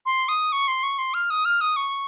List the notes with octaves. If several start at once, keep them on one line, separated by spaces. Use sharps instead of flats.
C6
D#6
C#6
C6
C#6
C6
F6
D#6
F6
D#6
C#6